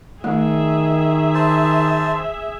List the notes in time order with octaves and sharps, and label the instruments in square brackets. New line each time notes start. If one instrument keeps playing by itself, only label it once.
[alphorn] D#3 [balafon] A3 [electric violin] G#4 E5
[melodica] C5 A5